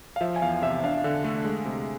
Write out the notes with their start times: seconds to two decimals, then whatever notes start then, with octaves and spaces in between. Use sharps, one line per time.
0.16 F5
0.21 F3 E5
0.36 G#5
0.42 E2 F5
0.62 C3 E5
0.84 D4 F5
1.04 D3
1.24 A3
1.45 G#3
1.65 C3